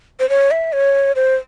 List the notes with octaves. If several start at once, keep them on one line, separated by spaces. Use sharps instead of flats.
C5
C#5
E5
C#5
C5